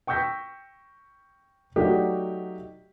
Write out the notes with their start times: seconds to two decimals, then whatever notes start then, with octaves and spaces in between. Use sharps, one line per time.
0.07 G5 C#6 E6 G6 A#6 B6
1.76 F#3 A3 D#4 F#4 G4 D5